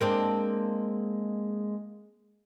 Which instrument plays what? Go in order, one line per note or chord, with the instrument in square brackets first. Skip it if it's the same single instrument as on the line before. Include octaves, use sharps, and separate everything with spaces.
[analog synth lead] G#3 [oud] A#3 C4 D4